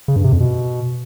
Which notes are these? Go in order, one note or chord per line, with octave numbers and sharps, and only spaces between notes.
C#3
G2
C3
F2
B2